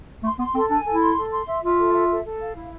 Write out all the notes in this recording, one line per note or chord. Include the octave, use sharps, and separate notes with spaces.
A3 C6
B3 C6
C4 A4
D4 G#5
A4
E4
C6
A4
C6
E5
F4 E5
A4
E5
A4
A4
F5
E4